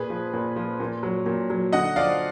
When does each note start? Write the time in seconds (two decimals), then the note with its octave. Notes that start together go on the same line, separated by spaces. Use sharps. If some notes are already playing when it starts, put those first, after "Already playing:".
Already playing: A#2 G#4 B4
0.10 F3
0.33 A#2
0.56 F3
0.80 A#2
1.03 F#3
1.26 A#2
1.50 F#3
1.72 D3 D#5 F#5
1.96 F3 D5 F5